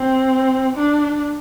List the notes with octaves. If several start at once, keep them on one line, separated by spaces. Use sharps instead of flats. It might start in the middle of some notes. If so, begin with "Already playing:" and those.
Already playing: C4
D4